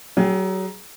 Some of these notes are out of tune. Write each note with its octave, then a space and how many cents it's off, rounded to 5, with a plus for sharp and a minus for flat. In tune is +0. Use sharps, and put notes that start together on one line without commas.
F#3 +30 G#4 +0 G5 +0